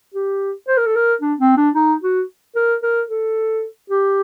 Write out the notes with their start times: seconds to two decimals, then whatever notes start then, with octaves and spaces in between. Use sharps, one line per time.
0.14 G4
0.68 C5
0.77 A#4
0.86 A4
0.95 A#4
1.21 D4
1.40 C4
1.57 D4
1.75 D#4
2.03 F#4
2.56 A#4
2.83 A#4
3.09 A4
3.90 G4